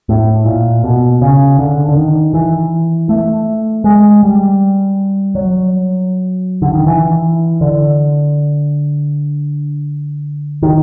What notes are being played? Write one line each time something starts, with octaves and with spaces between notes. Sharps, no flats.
A2
A#2
B2
C#3
D3
D3
D#3
E3
A3
G#3
G3
F#3
D3
D#3
E3
D3
D#3